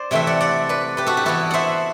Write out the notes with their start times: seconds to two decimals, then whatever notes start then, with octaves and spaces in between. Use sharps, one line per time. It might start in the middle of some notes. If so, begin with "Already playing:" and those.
Already playing: C5 D5
0.11 C3 E3 A3 E5 G5
0.27 D5 F#5
0.41 D5 F#5
0.69 B4 D5
0.97 G4 B4
1.06 F#4 A4
1.17 G4
1.25 E3 B3 E4 F#4 A4
1.51 C5 E5 F#5